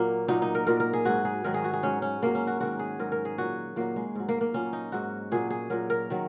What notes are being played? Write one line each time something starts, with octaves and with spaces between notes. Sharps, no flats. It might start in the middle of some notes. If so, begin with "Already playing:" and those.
Already playing: A#2 F#3 A#3
A#2 F#3 D#4
D#4
A#4
A#2 F#3 A#4
A#4
G#4
G#2 F#3 F#4
G#4
G#2 D#3 F#3 A#4
G#4
F#4
G#4
G#2 F#3 C#4
C#4
G#2 F#3 A#3
C#4
F#4
G#2 D#3 F#3 F#4
G#4
G#2 F#3 A#4
A#4
G#4
A#2 F#3 F#4
A#2 F#3 A#3
G#3
G#2 F#3
A#3
A#3
A#2 F#3 C#4
D#4
G#2 F#3 F#4
A#2 F#3 G#4
G#4
A#2 F#3 A#4
A#4
D#3 F#3